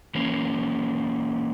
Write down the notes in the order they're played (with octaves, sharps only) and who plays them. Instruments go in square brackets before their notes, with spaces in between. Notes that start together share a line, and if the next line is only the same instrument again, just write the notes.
[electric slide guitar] E3 A#3 C#4